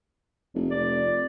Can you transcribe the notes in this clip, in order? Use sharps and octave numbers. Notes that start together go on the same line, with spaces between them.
F1
D5